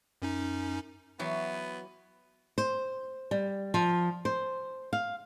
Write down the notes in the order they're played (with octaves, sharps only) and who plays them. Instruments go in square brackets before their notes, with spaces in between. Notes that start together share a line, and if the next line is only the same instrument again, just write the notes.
[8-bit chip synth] F#2 C#4 D#4
[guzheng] E3 F#3 G5 [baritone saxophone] B3
[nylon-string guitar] C5
G3
F3
C5
F5